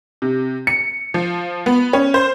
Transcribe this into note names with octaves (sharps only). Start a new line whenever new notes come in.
C3
C#7
F3
B3
C#4
C5